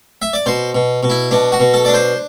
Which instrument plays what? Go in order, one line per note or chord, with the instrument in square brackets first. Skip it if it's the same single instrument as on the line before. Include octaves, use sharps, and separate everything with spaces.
[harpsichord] E5
D5
B2 C5
B2
B2
E4
B2 D4
F#4
B2
A4
D4 D5
C5